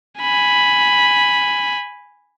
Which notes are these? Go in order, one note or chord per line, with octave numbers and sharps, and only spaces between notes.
G#5 B5